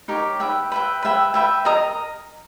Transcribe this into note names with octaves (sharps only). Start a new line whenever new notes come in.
D#4 G4 A#4 C#5
B4 E5 G5
B4 E5 G5
B4 E5 G5
B4 E5 G5
A#4 D#5 A#5 D#6